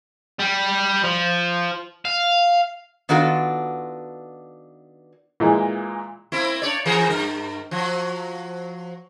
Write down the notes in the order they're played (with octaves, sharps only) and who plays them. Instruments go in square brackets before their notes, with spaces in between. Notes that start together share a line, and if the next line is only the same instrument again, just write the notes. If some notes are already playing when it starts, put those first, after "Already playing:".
[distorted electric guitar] G3
F3
F5
[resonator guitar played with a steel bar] D#3 B3 D4 F4 F#4 A4
[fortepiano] A#2 E3 G#3
[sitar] A#3 C4 E4
D4 C#5 D5
E3 G#4 A#4
G2 A#4
F3 F#3